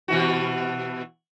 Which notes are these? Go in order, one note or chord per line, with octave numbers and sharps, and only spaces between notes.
B2 E3 F#4